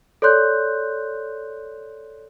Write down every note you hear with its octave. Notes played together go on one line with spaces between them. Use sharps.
A4 C#5 D5 C6 F#6 G6